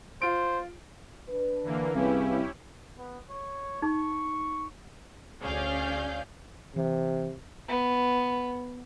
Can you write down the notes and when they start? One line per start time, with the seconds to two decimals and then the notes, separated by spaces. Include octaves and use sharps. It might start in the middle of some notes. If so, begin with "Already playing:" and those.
0.22 F4 C5 D7
1.29 D4 B4
1.63 D3 E3 A#3
1.95 C2 C#4 E4 G4 G#4 B4 F5
2.98 B3
3.30 C#5
3.82 D#4 C#6
5.42 D2 C#4 G#4 D5 F5 G6
6.76 C3 E3
7.68 B3